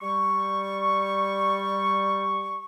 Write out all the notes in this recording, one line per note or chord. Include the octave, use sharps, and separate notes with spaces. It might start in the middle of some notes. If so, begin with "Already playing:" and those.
G3 C#6